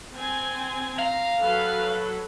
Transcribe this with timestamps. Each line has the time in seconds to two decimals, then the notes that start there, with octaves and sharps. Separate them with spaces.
0.16 C4 G#5
0.99 F5 A#5
1.40 F#3 A4 B4